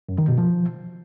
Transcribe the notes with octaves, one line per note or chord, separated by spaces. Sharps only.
F#2
D#3
B2
F3